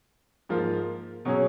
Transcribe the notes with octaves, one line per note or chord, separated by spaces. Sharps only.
G#2 F3 A#3 F4
B2 F#3 C#4 G#4